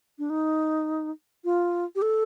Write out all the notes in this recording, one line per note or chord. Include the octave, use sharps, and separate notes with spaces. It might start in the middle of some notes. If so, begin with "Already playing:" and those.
D4
D#4
F4
G4
A4